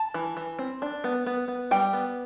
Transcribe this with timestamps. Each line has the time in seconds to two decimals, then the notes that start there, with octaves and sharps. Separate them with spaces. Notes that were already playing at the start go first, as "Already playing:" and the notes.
Already playing: A5
0.14 E3
0.37 E3
0.59 C4
0.82 D4
1.04 B3
1.26 B3
1.48 B3
1.71 G3 G5
1.93 B3